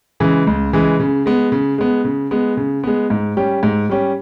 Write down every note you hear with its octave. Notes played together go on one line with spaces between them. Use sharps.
C#3 E3 G#3
C#2
C#3 E3 G#3
C#3
G#3 B3
C#3
G#3 B3
C#3
G#3 B3
C#3
G#3 B3
G#2
G3 C#4 G4
G#2
G3 C#4 G4